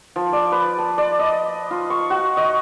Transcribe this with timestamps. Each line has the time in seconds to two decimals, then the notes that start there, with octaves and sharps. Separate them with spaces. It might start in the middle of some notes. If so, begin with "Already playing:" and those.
0.16 F3
0.33 D5
0.52 B4
0.78 A5
0.98 D5
1.19 D#5
1.71 F4
1.90 C#6
2.10 F#4
2.37 D#5